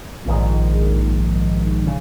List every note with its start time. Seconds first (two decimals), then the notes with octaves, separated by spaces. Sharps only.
0.25 A#1 G#2 D#3
1.85 C#3